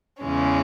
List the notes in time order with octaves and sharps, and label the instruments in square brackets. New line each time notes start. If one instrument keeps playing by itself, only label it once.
[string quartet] E2 C#3 E3 G#3 C#4